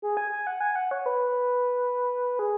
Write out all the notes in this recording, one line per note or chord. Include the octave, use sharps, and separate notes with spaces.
G#4
G#5
G#5
F#5
G#5
F#5
C#5
B4
G#4